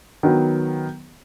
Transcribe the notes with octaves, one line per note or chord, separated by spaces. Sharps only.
D#3 F#3 B3